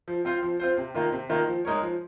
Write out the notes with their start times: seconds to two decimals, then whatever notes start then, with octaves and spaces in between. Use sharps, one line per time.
0.08 F3
0.25 C4 F4 C5
0.43 F3
0.60 C4 F4 C5
0.77 C3
0.94 D#3 A#3 F4
1.12 C3
1.29 D#3 A#3 F4
1.47 F3
1.65 G#3 D#4 A#4 C#5
1.82 F3